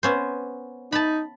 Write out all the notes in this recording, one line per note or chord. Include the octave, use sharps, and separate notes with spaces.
B3 C#4 C5
D#4 A5 B5